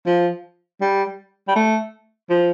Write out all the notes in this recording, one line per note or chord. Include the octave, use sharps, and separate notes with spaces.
F3
G3
G3
A3
F3